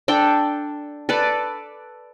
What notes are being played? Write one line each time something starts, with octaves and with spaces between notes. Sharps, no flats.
D4 A4 D5 G5
A4 B4 D5